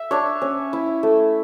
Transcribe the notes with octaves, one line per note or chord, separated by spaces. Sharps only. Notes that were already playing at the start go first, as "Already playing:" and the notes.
Already playing: E5
D4 C#5
C#4
E4
A3